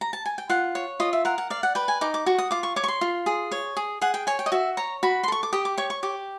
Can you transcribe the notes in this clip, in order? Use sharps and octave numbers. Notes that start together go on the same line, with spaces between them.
A#5
A5
G#5
G5
F4 F#5
C#5
F4 D#5
E5
A#4 F#5
F#5
D5 F5
F#5
B4 G5
G#5
D#4 D6
D6
F#4 C#6
D#6
F4 D6
C#6
C#5 D6
C#6
C6
F4
G#4
C#5
G#4
G#4 F#5
G5
C#5 G#5
G5
D#5
F#4 E5
C#5 A#5
F#4 B5
C6
A4 C#6
D6
G4 D#6
D6
C#5 C#6
C#6
G4 D6